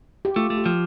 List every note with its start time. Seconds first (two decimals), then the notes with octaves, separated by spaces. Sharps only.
0.25 G4
0.36 A3 F4
0.50 A3
0.57 G4
0.66 F3